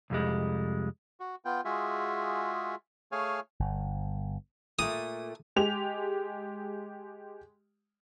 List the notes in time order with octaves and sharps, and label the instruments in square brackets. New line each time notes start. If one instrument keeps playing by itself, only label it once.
[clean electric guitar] C2 F2 G3 G#3
[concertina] F#4
B3 F4 G5
G#3 F4 F#4 G#4 E5
A3 G#4 C#5 F5 G#5
[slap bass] G1
[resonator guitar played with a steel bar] A#2 A3 [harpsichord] D#6
[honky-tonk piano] G#3 G4 F7